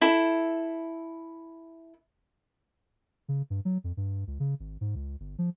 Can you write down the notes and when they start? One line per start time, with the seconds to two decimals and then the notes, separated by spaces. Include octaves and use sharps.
0.01 E4 A4
3.28 C#3
3.50 G2
3.65 F#3
3.84 F2
3.97 G2
4.27 C#2
4.40 C#3
4.60 G#1
4.81 G#2
4.95 C#2
5.20 G1
5.38 F3